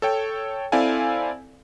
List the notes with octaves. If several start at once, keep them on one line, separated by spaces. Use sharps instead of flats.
A4 C#5 G5
C4 E4 A4 D5 F5 G#5